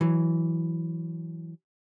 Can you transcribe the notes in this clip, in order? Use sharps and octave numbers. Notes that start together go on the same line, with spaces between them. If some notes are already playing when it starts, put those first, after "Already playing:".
E3 F#3